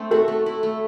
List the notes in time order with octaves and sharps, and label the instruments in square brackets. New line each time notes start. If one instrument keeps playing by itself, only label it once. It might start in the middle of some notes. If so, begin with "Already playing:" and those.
Already playing: [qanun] A3 C4 D4
[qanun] F#4 [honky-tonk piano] A4
[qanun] A3
E4
A3